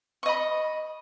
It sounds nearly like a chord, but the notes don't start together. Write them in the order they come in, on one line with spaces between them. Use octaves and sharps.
C#6 D#5 B5